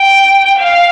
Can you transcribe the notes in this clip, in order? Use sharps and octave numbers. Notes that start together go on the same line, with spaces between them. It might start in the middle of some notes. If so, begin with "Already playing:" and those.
Already playing: G5
F5